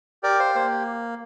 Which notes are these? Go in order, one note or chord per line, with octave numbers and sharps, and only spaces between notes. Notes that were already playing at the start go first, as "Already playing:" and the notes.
G4 A#4 D5
C5 F5
A#3 C5